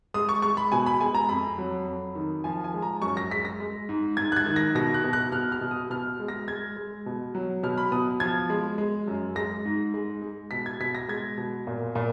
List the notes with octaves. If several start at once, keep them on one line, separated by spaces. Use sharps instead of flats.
G#3 D#6
C#6
G#3 C#6
B5
B2 G#5
B5
G#3 G#5
A#5
F2 B5
F#3
F2
D#3
F3 G#5
G#5
G#3
A#5
F#2 C#6
A#6
G#3 B6
A#6
G#3
G#2
G#2 G#6
F#6
G#6
D#3
A#6
B2 A#6
F#6
B2
F#6
B2 F6
F6
B2
D#6
B2 F6
G#3
A#6
G#3 G#6
G#3
B2
F#3
B2 F6
B5
B2 D#6
F3 G#6
G#3
G#3
F#2
G#3 A#6
G#2
G#3
G#3
B2 B6
G#6
B2 B6
A#6
G#3 G#6
B2
A#2
A#2